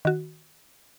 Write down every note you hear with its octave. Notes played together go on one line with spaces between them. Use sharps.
D#3 F#4